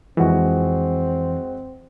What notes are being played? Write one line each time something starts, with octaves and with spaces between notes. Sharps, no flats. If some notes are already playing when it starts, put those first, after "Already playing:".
F2 E3 G#3 C4 F#4